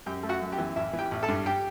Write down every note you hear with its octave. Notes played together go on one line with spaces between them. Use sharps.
F#2 G4 G5
A3
F#4 F#5
F#2
G4 G5
E3
A1 E4 E5
E3
G4 G5
A1
A4 A5
G2
G4 G5